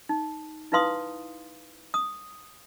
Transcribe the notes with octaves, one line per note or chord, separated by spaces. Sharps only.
D#4
D#4 E4 B4 F5 C6 D#6
D#6